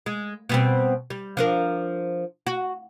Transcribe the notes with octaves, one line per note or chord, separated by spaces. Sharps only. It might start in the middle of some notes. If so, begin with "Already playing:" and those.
G#3
B2 G3 C4
G3
F3 D4 A#4
F#4